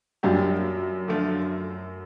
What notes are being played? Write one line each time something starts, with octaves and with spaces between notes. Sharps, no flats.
F#2 A#2 G3 A#3 D4 G4
D3 F3 A3